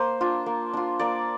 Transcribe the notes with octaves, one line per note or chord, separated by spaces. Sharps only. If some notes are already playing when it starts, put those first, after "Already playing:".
Already playing: A#3 C5
D4 F4
A#3
D4 F4
A#3 D5